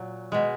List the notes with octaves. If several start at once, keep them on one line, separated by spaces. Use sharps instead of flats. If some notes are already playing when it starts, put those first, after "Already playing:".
Already playing: A#2 F#3
B2 G#3